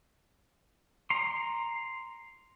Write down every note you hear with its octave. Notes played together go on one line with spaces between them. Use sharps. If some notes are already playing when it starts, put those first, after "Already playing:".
A#5 C6